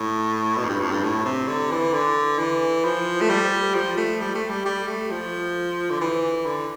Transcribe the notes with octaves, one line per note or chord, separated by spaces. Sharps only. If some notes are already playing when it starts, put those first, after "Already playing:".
Already playing: A2
B2
F2
G2
F2
G2
A2
C3
D3
E3
D3
E3
F3
A3
G3
F3
A3
G3
A3
G3
G3
A3
F3
D3
E3
D3